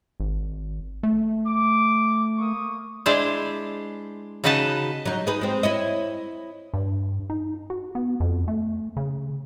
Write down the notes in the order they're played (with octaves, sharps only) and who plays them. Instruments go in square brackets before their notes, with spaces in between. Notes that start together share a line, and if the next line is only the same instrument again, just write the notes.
[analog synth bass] G#1
A3
[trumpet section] D6
A#3 C#6 D#6
[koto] G#3 D4 E4 C5
C#3 D#4 F#4 B4 D#5 A5
[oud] F#3 D#4
D#4 G#4 B4
G#3 C4
E4 C#5 D#5
[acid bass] G2
D#4
F#4
B3
F2
A3
C#3